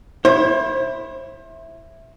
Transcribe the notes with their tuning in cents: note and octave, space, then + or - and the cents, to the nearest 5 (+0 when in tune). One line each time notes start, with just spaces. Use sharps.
E4 +0 C5 +35